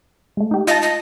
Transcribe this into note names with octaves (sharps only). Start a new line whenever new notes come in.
G#3 A3
D#4 G4
F4 D#5 A5
D#5